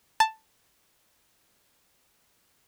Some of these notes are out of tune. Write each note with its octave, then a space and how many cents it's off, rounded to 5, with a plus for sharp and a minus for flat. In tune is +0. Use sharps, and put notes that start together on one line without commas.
A5 +5